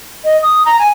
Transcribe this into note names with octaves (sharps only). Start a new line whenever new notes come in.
D#5
D#6
A#5
G#5